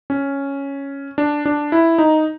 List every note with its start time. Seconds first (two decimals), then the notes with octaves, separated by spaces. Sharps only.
0.10 C#4
1.18 D4
1.46 D4
1.72 E4
1.98 D#4